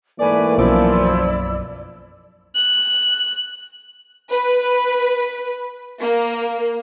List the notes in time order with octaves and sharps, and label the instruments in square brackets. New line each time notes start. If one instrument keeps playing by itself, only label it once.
[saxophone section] G#2 A3 D5 [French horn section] E3 A#3 [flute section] B4 G#5
[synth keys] B1 F#2 D6 [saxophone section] F3 [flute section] E4 D5 E6
[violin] F#6
[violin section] B4
A#3